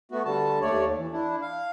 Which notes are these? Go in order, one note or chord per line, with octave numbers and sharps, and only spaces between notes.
A3 B3 F#4
D3 G3 A5
D#2 A3 C#5 D5
E3
D4 E4
F5